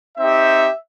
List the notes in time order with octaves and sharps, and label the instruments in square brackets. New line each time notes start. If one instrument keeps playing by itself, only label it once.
[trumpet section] C4 D#4 G4 E5